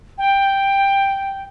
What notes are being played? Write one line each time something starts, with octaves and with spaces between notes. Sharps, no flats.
G5